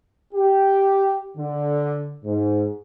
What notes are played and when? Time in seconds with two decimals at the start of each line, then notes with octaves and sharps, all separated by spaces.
0.34 G4
1.38 D3
2.25 G#2